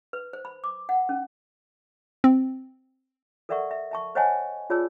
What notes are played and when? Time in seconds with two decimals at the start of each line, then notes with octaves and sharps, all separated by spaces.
0.13 B4
0.33 C5
0.45 B5
0.64 D6
0.89 F#5
1.09 C#4
2.24 C4
3.49 A4 A#4 D5 E5 F#5 C#6
3.71 E5
3.91 E5 A5 C#6
4.15 C5 C#5 D#5 F#5 G#5 A5
4.70 F4 G#4 C#5 D5 A5 E6